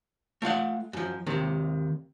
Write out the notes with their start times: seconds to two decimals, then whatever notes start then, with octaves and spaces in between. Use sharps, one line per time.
0.42 A3 F4 F5 F#5
0.93 F#2 F3
1.27 D#2 C3 D#3